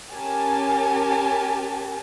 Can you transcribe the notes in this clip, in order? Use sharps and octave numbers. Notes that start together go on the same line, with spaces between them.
C#4 G4 A#4 G#5 A5